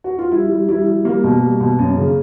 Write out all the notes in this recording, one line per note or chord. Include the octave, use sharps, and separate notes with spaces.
F#4
F4
G3 E4
G3
G3 E4
G3
G3 A#3
B2
G3
B2
F#2
C#3